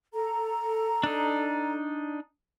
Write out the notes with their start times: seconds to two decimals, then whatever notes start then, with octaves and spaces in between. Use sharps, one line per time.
0.13 A4 A#5
1.03 D4 D#4